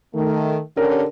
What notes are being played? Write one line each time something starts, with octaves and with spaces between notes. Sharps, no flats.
D#3 A3
D3 C#4 G4 A#4